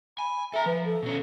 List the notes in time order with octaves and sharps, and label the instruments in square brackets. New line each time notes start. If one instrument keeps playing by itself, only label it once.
[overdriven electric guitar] G#5 [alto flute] B5
[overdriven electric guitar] A4 A#5 [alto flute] E5
[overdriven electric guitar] F3 [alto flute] B4
[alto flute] A4
[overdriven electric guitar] B2 C#4